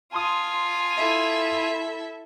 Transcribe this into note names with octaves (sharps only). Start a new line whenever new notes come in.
F4 G#5 A5 C6 D#6
E4 A4 E5